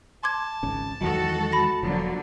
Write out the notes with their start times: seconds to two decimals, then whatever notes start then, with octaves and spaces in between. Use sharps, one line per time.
0.23 A5 C6 D6 G#6
0.63 G#1 C#2 C#3
1.01 E2 D#3 F#3 G#3 F#4 A4
1.52 B5 A#6
1.83 E1 D3 F3 F#3 A#3